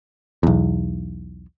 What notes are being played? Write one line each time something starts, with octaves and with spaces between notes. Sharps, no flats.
B1 E2